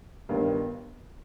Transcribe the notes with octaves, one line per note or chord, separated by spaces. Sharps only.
G1 G2 D#3